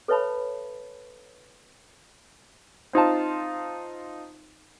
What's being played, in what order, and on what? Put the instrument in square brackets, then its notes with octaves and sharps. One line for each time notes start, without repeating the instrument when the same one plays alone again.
[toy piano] A4 B4 C#5 E5 A5 B5
[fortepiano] C4 D#4 F4 A5